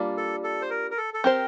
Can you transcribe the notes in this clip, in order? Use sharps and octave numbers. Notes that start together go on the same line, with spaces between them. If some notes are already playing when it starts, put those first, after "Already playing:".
Already playing: G3 A#3 D4 F4
A4
A4
C5
A#4
A#4
A4
A4
C4 G4 A#4 C5